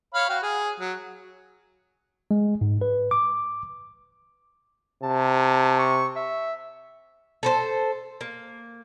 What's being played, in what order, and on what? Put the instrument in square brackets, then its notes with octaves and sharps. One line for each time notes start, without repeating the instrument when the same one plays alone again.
[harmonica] C#5 F5 B5
F#4 F5 G5
G#4
F#3
[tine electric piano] G#3
G#2
B4
D6
[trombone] C3 [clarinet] A5
[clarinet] C#6
E5
[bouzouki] A4 B4 C5
A#3